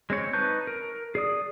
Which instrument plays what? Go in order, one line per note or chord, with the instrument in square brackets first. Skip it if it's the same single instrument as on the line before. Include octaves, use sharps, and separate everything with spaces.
[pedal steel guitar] G#3 C4 C#5
D#4 B4 A5 C#6 G6
A#4
G#4 D5 D#6